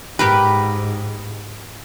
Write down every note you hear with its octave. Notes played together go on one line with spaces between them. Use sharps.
G#2 G4 A#4 B4